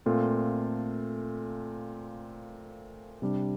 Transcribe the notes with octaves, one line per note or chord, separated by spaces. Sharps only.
A#2 A3 C4 F4 A4
C3 G3 D4